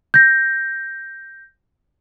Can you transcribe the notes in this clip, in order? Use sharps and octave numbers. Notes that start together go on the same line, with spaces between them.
G6 A#6